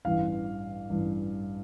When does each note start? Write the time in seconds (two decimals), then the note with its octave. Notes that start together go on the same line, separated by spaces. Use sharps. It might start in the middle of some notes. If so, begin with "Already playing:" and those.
0.05 A1 G2 E3 F5
0.89 A1 G2 E3